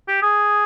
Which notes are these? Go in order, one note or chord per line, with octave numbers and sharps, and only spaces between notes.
G4
G#4